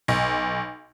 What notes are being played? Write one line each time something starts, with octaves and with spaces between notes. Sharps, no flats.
B1